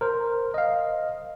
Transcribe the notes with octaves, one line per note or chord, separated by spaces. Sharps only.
A#4 C5
D#5 F5